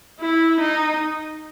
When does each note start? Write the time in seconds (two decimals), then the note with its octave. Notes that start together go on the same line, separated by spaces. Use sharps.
0.20 E4
0.60 D#4